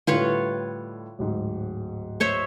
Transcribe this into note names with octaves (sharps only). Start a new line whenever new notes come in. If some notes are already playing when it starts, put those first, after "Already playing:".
A2 D3 G3 F4 B4 C#5
D1 G#2
C5 C#5 E5